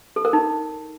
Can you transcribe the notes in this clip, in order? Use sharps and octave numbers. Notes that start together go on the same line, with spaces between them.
A4
A#4
D#4